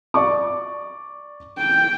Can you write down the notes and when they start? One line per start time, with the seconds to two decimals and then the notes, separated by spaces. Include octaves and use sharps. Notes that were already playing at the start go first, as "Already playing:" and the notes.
0.14 D5 C#6 D6
1.58 G5